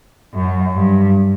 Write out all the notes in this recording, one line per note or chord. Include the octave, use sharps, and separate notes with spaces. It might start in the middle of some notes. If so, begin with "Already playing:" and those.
F#2
G2